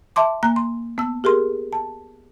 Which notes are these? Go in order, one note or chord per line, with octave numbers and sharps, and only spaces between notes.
E5 A5 C6 D6
A#3 A#5 F#6
C6
B3 E6
G4 G#4 A#4 C6
A5